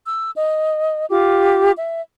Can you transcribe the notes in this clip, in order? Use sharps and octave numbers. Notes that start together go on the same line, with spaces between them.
E6
D#5
F4 G4 D6
E5